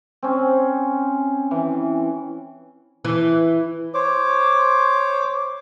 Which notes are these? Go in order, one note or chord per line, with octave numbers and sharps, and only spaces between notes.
C4 C#4
E3
E3
C5 C#5 D6